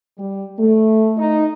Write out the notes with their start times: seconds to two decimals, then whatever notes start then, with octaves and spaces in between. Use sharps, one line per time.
0.19 G3
0.59 A3
1.18 D#4